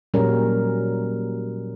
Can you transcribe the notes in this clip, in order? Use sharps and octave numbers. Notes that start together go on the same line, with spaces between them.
A#2 F#3 G3 C#4 A#4